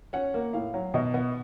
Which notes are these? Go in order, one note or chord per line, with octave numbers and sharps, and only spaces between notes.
C#4 F#5
A#3
A2 F5
F#3
B2 D#5
B3